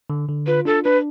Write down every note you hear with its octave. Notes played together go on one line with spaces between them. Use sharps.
D3
D3
F4 B4
D4 A4
D4 B4